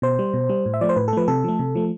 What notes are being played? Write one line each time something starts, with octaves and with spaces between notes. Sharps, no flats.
B2 C5
G3
B2
G3
A2
E5
F3 A3 D5
C5
A2 B4
A4
F3 A3 B4
C3 A4
F3 A3
C3
F3 A3